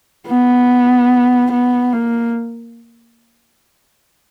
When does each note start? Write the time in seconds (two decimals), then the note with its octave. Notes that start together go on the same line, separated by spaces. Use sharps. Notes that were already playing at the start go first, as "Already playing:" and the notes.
0.27 B3
1.51 B3
1.93 A#3